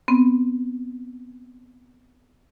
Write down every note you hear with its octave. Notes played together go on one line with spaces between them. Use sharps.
B3 C4